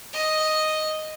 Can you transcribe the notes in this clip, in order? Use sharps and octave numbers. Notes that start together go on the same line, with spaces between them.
D#5